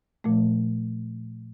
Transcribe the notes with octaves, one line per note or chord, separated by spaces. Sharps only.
A#2 F3 A3